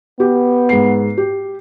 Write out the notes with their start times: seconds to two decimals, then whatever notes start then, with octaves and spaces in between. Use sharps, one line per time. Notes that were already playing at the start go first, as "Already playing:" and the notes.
0.20 B3 G4
0.69 G#2 C7
1.17 G4